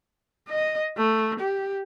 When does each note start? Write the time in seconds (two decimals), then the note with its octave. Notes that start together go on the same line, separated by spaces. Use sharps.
0.49 D#5
0.97 A3
1.40 G4